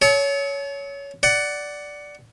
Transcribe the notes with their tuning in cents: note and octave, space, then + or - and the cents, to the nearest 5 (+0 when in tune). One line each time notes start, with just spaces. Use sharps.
A4 -40 C#5 +15
D5 +0 F#5 +15